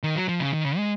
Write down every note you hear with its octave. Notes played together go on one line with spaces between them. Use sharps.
D#3
F#3
F3
C#3
D#3
C#3
G#3